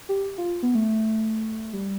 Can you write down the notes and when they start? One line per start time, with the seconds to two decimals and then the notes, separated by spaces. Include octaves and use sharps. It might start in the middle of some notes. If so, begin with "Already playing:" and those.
0.09 G4
0.38 F4
0.63 B3
0.75 A3
1.73 G3